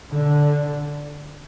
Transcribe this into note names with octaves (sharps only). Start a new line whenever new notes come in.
D3